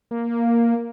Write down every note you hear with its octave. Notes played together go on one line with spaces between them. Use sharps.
A#3